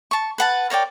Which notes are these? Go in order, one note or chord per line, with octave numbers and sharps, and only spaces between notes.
A5 C#6
B4 F#5 A5
A#4 C#5 D5 G5